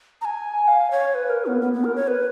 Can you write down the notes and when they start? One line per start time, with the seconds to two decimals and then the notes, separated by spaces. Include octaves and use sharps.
0.21 A#5
0.25 G#5
0.68 F5
0.91 C#5
1.15 B4
1.30 A#4
1.46 B3
1.62 B3
1.73 B3
1.84 A#4
1.96 C#5
2.08 B4